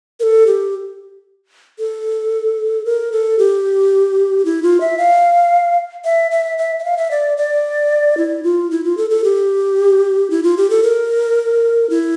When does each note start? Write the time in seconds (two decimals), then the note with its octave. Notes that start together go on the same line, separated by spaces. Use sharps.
0.20 A#4
0.23 A4
0.47 G4
1.79 A4
2.85 A#4
3.12 A4
3.39 G4
4.45 E4
4.63 F4
4.81 E5
4.98 F5
6.05 E5
6.31 E5
6.58 E5
6.79 E5
6.84 F5
6.97 E5
7.11 D5
7.37 D5
8.17 E4
8.44 F4
8.71 E4
8.84 F4
8.97 A4
9.10 A4
9.24 G4
10.30 E4
10.43 F4
10.57 G4
10.70 A4
10.83 A#4
11.90 E4